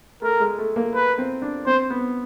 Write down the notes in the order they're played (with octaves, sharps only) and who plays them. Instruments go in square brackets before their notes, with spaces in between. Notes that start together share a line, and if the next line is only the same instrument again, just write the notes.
[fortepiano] A3 [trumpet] A#4
[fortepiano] G#3
A3
A#3
[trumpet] B4
[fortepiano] C4
D4
[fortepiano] C4 [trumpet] C5
[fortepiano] B3